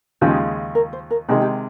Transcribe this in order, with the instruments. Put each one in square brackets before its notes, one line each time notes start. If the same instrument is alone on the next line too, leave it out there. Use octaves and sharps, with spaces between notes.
[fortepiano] D#2 C#3 F3 G#3 [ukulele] G4
[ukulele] A#4
C5
A#4
[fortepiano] C3 D#3 G#3 [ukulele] G#4
[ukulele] G4